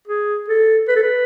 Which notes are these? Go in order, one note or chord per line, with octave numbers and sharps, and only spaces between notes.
G#4
A4
B4
A4
B4